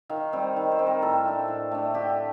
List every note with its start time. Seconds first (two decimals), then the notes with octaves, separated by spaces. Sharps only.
0.10 D#3 F5
0.33 G3 C4
0.56 D#3
0.72 C5
0.79 G3 C4
0.87 A#4
1.02 A2 A4
1.25 A3 D4
1.48 A2
1.72 A3 D4
1.94 D3 G4